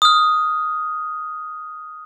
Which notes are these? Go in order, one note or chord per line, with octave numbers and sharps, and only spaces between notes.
D#6 F6